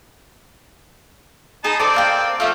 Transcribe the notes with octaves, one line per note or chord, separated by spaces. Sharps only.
D#4 G#4 A5 B5
C4 A4 D5 D#5 D6
A#4 F5 G5
F3 A3 E5 F5